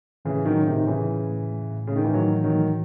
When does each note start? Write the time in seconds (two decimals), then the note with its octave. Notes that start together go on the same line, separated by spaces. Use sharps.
0.25 A2 C#3 E3
0.45 A2 D#3 F#3
0.60 C#3
0.67 A2 C3 D#3
0.87 A2 C#3 E3
1.09 A2
1.30 A2
1.50 A2
1.71 A2
1.87 C#3
1.92 A2 D#3
2.05 E3
2.13 A2 D#3 F#3
2.34 E3
2.44 D#3 F#3
2.55 A3